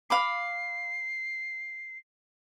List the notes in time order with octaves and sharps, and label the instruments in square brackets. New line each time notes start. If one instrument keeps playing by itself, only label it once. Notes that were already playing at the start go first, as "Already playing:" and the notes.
[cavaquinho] F5 B5 D6 [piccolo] C7